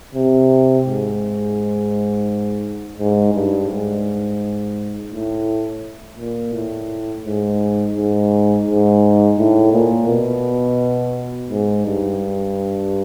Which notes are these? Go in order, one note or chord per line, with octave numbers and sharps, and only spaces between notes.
C3
G#2
G#2
G2
G#2
A2
A#2
A2
G#2
G#2
G#2
A2
A#2
B2
G#2
G2